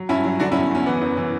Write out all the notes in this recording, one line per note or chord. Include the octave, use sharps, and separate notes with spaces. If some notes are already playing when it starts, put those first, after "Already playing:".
Already playing: F#3
G2 C#4 E4
F#3
D3 D4 F#4
C#4 E4
E2
E2 C#4
E3 B3
F#2
E3